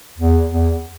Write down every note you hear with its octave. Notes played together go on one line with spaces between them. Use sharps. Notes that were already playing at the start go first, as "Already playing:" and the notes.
E2
E2